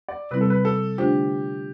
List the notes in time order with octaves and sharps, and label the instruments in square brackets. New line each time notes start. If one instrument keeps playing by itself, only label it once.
[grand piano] D5
[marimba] C3 G3 C4 E4 [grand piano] B4
[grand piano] A4
B4
A4
[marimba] D3 A3 D4 F4 C5 [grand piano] G4